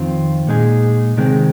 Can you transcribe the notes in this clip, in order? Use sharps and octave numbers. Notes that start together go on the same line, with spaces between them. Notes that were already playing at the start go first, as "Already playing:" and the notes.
Already playing: F2 D#3 C4 F4
A#2 G#3 D#4 G#4
C3 D#3 G#3 C4